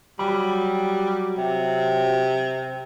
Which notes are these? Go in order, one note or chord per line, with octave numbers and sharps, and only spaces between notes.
F#3 G3 B5
C3